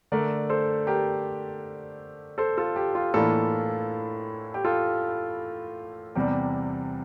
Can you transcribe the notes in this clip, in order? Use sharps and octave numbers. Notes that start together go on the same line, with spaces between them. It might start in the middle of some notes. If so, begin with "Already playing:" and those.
D3 A3 D4 A#4 D5
A4 C5
G4 A#4
A4 C5
F4 A4
G4
F4
A2 E3 A#3 D4 F4 A4
G4
F4 A4
E2 C3 G3 G4